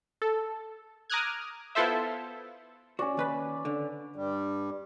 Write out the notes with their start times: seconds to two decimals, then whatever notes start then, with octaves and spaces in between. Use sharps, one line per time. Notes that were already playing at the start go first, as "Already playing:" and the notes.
0.22 A4
1.10 A#5 D6 D#6 F6 F#6 G#6
1.75 B3 E4 F4 A4 C5 E5
2.99 C#4 F#4 D5
3.17 D#2 B4 B5
3.65 D3
4.16 G2 G3